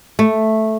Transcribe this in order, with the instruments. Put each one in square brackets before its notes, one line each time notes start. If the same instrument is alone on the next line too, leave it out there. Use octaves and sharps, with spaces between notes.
[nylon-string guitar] A3